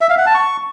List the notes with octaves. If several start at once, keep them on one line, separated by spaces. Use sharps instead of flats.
E5
F5
F#5
A5
C#6